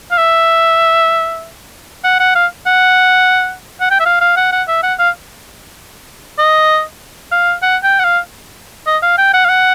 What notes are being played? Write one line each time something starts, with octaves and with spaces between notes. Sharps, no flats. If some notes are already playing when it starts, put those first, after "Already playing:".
F5
E5
F#5
F#5
F5
F#5
F#5
G5
E5
F5
F5
F#5
F#5
E5
F#5
F5
D#5
F5
F#5
G5
F#5
F5
D#5
F5
G5
F#5
F5
F#5